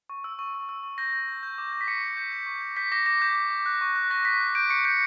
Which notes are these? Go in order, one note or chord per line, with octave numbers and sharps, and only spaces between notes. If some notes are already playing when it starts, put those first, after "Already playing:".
C#6
E6
C#6
C#6
E6
C#6
G6 A#6
G6
G6
G6
D6
G6
B6
C#6 C#7
G6
G6
G6
C#6
G6
G6 B6
D6 A#6
D6 A#6
D6 G6
G6
D6
F#6
C#6
F#6
C#6 A#6
C#6 B6
F#6
G6 D7
C#6 C#7
G6 C#7